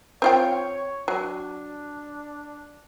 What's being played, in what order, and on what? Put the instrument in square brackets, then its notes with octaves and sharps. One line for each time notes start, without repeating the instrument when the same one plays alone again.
[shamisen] C4 F4 G5 [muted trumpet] C#5
[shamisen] F#3 [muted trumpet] D4